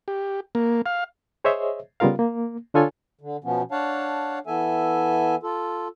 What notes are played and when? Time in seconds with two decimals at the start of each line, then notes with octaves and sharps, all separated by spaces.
0.08 G4
0.55 A#3
0.86 F5
1.44 G#4 C5 C#5 D#5 E5
2.00 C#3 G3 B3 F4 A#4 F5
2.19 A#3
2.74 D3 D4 F4 A4 C#5 G#5
3.21 D3
3.44 B2 F3 B3 C#4
3.72 D4 C#5 F5 F#5 A5
4.47 E3 B3 A4 E5 G#5
5.43 F4 A4